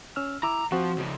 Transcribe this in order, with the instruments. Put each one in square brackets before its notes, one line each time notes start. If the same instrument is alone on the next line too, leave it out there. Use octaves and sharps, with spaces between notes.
[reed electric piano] C#4 E6 F6
[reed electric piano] E4 D6 E6 [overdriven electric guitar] A#5
[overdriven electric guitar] F3 [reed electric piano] C4 F#4
[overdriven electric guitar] C#3 F3